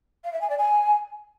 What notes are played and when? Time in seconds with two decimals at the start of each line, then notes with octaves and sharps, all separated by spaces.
0.24 F5
0.33 E5
0.41 G#5
0.50 D5
0.58 G#5